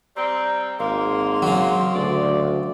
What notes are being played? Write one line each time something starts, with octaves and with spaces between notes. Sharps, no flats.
G3 C4 A#5
G#1 G#3 A#3 C6
C#3 F#3
D2 D5